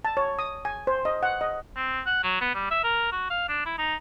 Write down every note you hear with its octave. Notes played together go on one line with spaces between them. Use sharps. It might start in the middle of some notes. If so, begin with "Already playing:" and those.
A5
C#5
D#6
G#5
C5
D#5
F#5
D#5
C4
F#5
F#3
B3
G3
E5
A#4
F#4
F5
D4
E4
D#4